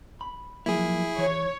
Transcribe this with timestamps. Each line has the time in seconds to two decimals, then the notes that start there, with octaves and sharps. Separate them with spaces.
0.21 B5
0.66 F3 F#3 A#3 E4 G#4
1.18 E3 C#5